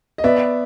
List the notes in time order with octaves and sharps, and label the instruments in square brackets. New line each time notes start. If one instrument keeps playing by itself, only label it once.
[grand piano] D#5
[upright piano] B3 [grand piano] D5 E5